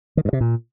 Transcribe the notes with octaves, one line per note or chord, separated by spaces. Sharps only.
D#3
G2
C3
A#2